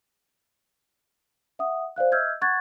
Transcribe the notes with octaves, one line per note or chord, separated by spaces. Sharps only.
E5 F#5 D#6
C5 D5 F5 F#6
D#5 E5 E6 F6 G6 G#6
F#5 C#6 F#6 G#6 A6